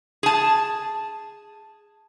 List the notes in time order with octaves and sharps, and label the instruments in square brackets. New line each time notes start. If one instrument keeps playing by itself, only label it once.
[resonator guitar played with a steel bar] G#4 A5